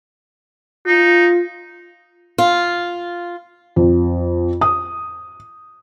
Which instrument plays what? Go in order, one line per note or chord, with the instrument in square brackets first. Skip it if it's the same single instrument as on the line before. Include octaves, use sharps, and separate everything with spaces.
[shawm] D#4 [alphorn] F4
[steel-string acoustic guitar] F4
[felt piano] F2
D#6